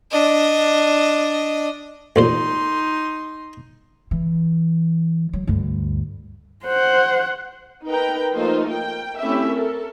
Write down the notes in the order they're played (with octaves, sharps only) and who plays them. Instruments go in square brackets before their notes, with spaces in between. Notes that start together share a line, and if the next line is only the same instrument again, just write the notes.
[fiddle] D4 D#5
[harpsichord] A1 A#2 C5 [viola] D#4 C6
[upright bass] E3
F#3
D2 G2
[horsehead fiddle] C5 F#5
[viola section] D#4 A#4 B4 G5 A#5
F3 A3 A#3 D#4 F4 C5
A#4 G5
A3 C4 C#4 E4 G4 E5
A4 A#4